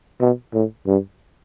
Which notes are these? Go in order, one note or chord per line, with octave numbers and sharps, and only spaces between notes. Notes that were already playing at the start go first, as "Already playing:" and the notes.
B2
A2
G2